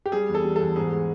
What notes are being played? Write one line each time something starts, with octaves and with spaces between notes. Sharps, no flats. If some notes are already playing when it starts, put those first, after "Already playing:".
G4
G3 G#4
E2
A4
G3
A4
E2
G#2 G#4
G#3